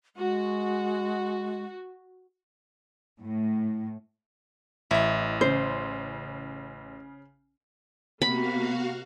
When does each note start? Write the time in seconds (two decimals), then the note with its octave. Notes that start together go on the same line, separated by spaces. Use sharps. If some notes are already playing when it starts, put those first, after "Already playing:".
0.16 G#3 F#4
3.22 A2
4.91 A1 E4 D#5
5.41 C#3 C5
8.22 C3 A#3 B3 F#4 F5 B5